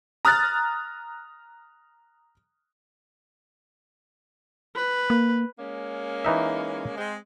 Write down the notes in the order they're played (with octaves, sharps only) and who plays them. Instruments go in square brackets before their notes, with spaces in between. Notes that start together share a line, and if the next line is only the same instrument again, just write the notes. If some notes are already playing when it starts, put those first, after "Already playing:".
[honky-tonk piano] A#5 D#6 F6 F#6 A6
[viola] B4
[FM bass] A#3
[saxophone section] G#3 A#3 C#4
[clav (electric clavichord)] E3 D#4 E5
[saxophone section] G#3 C4